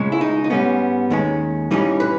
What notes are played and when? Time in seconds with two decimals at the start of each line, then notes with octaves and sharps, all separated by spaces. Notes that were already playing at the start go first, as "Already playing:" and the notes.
Already playing: C#2 C#3 G#3
0.12 E4
0.21 D#4
0.44 D#4
0.50 G#2 G3 B3 C#4
1.10 D#2 D#3 G#3 C#4
1.71 G2 E3 G3 C#4 D#4
2.00 B4